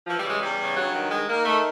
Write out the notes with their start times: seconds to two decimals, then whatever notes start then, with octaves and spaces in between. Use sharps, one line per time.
0.07 E3 F3
0.19 G3
0.24 C#3
0.30 G#3
0.42 E2 G3
0.60 C#3
0.76 G2 F#3
0.94 D#3
1.11 D#3 G#3
1.28 D#3 A#3
1.45 D#3 A3